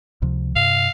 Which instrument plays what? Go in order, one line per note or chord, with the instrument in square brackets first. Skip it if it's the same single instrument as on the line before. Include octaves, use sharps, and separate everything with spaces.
[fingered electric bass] C#2 C3 F3
[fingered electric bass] G2 C3 [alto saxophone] F5